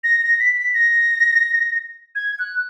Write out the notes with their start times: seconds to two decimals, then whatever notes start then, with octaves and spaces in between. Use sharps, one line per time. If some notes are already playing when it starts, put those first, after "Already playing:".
0.04 A#6
0.22 A#6
0.40 B6
0.56 B6
0.74 A#6
2.15 G#6
2.39 F#6